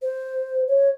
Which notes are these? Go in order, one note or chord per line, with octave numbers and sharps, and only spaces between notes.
C5
C#5